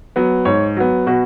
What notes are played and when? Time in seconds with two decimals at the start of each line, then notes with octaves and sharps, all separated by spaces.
0.16 F#3 B3
0.45 G#2 C#5
0.77 F#3 B3
1.07 B2 F#4